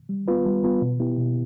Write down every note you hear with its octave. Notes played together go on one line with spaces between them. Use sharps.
G3
B3 F4 B4
G3
B3 F4 B4
B2
B3 E4 G4
B2